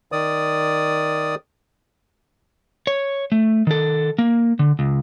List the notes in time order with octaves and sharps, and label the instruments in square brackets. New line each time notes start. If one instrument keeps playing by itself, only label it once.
[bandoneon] D#3 D5 D#6
[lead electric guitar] C#5
A3
D#3 A4
A#3
D3
C#2